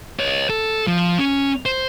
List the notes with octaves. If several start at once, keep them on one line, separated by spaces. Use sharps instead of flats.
C#5 D#5
A4
F3
C#4
C5